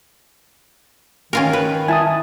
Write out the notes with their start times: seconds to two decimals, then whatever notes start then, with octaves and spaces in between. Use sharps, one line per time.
1.33 D#3 C#4 F4 A#4
1.53 B4
1.88 E4 G#5 A5 D#6